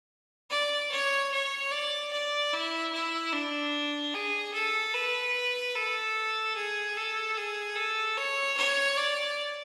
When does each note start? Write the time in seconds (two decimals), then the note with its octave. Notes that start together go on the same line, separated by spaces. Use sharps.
0.50 D5
0.92 C#5
1.32 C#5
1.71 D5
2.13 D5
2.53 E4
2.92 E4
3.32 D4
4.14 G#4
4.53 A4
4.94 B4
5.76 A4
6.56 G#4
6.97 A4
7.37 G#4
7.76 A4
8.18 C#5
8.57 C#5
8.97 D5